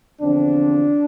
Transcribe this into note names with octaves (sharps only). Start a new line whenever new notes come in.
E2 D3 F3 C4 D4